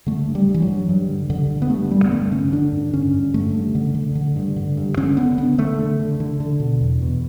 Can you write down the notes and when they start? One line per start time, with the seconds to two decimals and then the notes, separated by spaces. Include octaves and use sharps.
0.07 D3 A3
0.28 G2
0.35 G3
0.48 G2
0.54 E3
0.62 F#3
0.68 G2
0.89 G2
1.09 D3
1.30 G2 D3
1.50 D3
1.62 B3
1.70 G2 A3
1.90 D3 G3
2.05 B3
2.11 G2 A3
2.32 D3 C#4
2.52 D3 D4
2.72 G2
2.93 D3 C#4
3.14 G2
3.34 D3 A3
3.55 G2
3.75 D3
3.95 D3
4.15 D3
4.36 G2
4.56 D3
4.77 G2
4.97 D3 C#4
5.17 D3 B3
5.38 D3 B3
5.58 D3 A3
5.79 D3
6.00 D3
6.20 D3
6.40 D3
6.60 B2
6.81 E2
7.02 B2